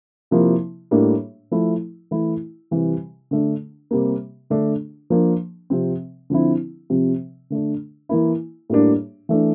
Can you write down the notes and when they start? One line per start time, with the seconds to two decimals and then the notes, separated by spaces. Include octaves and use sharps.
0.31 C3 F3 A#3 E4
0.91 A2 G3 A#3 D4
1.51 F3 A3 E4
2.11 E3 A3 E4
2.71 C3 E3 G3
3.31 D3 A3 D4
3.91 C3 G3 A#3
4.50 D3 A3 D4
5.10 F3 A#3 D4
5.70 C3 F3 C4
6.30 D3 F3 C4 E4
6.90 C3 F3 C4
7.50 D3 A3 D4
8.09 E3 A#3 E4
8.70 A2 G3 A#3 D4
9.29 E3 A3 D4